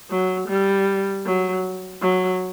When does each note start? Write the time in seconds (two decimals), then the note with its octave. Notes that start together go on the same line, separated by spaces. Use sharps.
0.10 F#3
0.49 G3
1.26 F#3
2.02 F#3